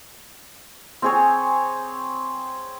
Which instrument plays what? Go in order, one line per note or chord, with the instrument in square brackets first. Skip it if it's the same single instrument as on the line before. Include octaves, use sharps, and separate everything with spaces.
[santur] C4 G#4 C#5